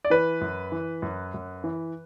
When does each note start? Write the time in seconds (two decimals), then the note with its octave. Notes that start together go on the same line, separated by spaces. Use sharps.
0.05 D5
0.10 E3 B4
0.41 F#2
0.72 E3
1.02 F#2
1.34 F#2
1.64 E3